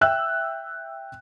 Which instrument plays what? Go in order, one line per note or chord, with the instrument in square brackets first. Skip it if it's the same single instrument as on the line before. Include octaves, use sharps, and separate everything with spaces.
[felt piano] E5 G5 E6 F#6